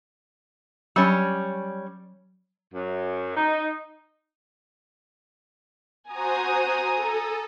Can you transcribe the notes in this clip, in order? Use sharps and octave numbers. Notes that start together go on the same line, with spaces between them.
F#3 G3 C#4
F#2
D#4
F#4 C5 G#5 A#5 D#6
A4